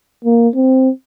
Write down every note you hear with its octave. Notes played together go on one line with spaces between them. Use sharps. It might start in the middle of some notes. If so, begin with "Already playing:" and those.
A#3
C4